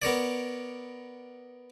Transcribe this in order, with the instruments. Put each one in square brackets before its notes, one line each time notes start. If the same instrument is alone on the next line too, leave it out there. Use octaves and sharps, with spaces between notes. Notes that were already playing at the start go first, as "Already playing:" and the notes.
[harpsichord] B3 A#4 C#5 D5